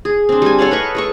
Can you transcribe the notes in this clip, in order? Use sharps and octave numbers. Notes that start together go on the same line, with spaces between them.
G#4
C4 D4
G3 G#5
A4 C#5 F5 F#5
B4 D#5 C#6
G#3 A4 C#6